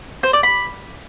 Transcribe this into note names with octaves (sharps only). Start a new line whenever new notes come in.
C5
D5
B5